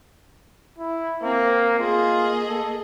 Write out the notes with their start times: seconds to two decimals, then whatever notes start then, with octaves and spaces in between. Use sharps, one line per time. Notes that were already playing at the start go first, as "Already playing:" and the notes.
0.79 E4
1.23 A#3 C4
1.80 A#3 F4 G#4 D#5
2.47 A4